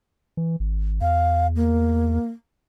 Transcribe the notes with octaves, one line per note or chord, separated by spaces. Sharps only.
E3
G#1
E2 F5
A#3